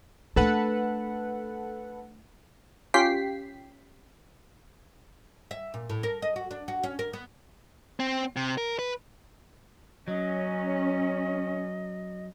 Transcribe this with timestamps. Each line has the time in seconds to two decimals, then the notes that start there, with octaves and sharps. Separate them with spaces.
0.36 A3 D4 A4 B4 F#5
2.94 C#4 F4 G4 G5 B6 C7
5.51 E5
5.74 A#2
5.90 A2
6.03 A#4
6.22 D#5
6.36 F#4
6.51 D4
6.68 F#4
6.83 C#4
6.99 A#4
7.13 B3
8.00 C4
8.36 C3
8.58 A#4
8.79 B4
10.08 F#3 C#4 D#5